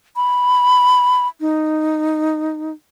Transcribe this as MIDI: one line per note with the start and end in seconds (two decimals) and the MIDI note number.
0.16 1.27 83
1.41 2.72 63